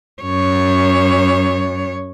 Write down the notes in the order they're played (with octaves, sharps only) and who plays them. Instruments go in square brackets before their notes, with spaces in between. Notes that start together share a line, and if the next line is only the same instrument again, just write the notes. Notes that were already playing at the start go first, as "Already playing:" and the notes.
[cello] F#2 C#5